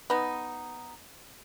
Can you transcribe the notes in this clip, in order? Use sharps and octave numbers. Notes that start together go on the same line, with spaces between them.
B3 D#4